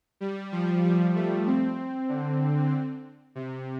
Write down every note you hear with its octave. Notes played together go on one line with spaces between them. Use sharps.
G3
F3
G3
A3
C4
D3
C3